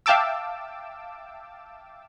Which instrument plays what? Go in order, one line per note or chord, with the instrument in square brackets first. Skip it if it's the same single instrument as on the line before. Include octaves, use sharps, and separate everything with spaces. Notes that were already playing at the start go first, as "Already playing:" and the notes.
[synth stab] E5 F5 G5 A5 D6 E6